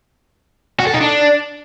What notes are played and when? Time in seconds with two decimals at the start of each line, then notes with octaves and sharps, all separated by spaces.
0.80 F#4
0.87 A4
0.94 D#4
1.01 D4